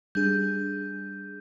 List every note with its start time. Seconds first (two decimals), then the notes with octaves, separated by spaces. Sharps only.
0.15 G3 D4 G#4 G6